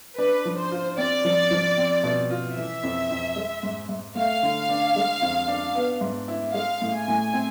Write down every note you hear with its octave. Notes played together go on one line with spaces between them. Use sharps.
D4 B4
F3
C5
F4
C4 D5
F3
F3
C4
B2
F4
E3 E5
F2
F2
G#3
G#2
G#2
A3 F5
D3
D4
G#3
F2
D4
B3
G#2
E4
G#3 F5
A2
G#5
A2
C4